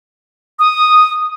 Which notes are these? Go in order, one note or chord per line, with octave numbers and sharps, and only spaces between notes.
D#6